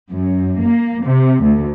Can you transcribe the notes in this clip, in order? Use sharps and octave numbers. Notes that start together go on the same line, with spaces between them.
F#2
A#3
C3
D2